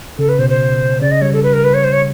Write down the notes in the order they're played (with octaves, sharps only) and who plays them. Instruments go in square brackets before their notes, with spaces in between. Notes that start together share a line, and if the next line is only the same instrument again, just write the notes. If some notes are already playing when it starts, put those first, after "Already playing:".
[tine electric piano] C#3 [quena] A4
[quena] B4
[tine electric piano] B2 [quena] C5
[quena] C5
[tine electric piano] C#3 [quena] D5
[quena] D#5
[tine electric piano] G3 [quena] C#5
[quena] A4
B4
A#4
B4
C#5
C5
C#5